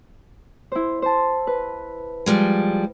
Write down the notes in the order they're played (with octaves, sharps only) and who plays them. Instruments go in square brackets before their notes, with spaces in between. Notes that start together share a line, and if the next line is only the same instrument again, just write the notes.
[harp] E4 C5
C5 A5
B4
[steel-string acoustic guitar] F3 G3 G#3